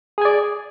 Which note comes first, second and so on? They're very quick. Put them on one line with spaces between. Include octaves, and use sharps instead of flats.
G#4 G#5 D5